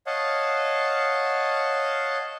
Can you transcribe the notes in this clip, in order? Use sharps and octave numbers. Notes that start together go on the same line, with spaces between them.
C#5 D#5 F5 F#5 A5